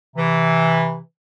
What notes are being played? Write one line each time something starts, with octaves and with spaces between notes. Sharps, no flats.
C3 E3